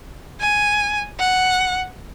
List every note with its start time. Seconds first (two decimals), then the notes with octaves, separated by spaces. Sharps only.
0.40 G#5
1.19 F#5